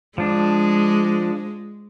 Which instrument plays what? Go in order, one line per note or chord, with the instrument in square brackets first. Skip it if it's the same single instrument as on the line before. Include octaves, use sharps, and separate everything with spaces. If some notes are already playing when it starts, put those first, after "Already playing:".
[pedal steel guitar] F3 D4 [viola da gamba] G#3